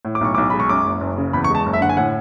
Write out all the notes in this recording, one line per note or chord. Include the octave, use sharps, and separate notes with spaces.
A2
D6
B1 C#6
B1 D6
G#3 B5
C#6
F#2 D6
F#1
F#1
C#3
E2 B5
C#6
G#3 A5
F#1
E5
D3 F#5
G#5
A2 F#5